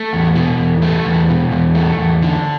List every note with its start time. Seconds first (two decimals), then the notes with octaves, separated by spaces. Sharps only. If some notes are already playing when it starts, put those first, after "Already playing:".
Already playing: A3
0.13 E2
0.36 B2
0.59 E2
0.82 A3
1.05 E2
1.29 B2
1.51 E2
1.74 A3
1.98 E2
2.22 D3